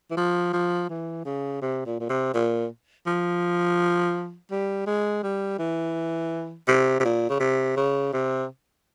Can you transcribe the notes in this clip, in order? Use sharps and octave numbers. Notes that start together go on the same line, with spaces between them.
E3
F3
F3
E3
C#3
C3
A#2
A#2
C3
A#2
F3
G3
G#3
G3
E3
C3
C3
A#2
C#3
C3
C#3
C3